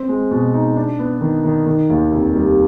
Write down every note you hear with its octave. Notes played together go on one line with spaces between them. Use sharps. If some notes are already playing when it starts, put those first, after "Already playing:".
Already playing: C4
G#3
B2
D#4
D4
B3
D#3
D#3
D#3
D#2
F1
G3